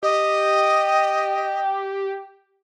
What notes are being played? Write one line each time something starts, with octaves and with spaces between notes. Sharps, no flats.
G4 D#5